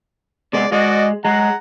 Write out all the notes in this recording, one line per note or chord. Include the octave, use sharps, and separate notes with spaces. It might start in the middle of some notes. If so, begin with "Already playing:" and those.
C3 G#3 B3 D5
G#3 F#4 D5 D#5
G#3 F#5 A#5